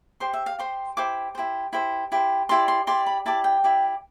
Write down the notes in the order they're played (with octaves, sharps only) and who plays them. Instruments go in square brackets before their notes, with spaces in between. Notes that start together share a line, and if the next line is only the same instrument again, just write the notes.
[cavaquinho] G4 C5 C6
E5
F5
G4 C5 C6
E4 G4 C5 D6
E4 G4 C5
E4 G4 C5
E4 G4 C5
E4 G4 D5 C6
C6
E4 G4 D5 C6
B5
E4 G4 D5 A5
G5
E4 G4 D5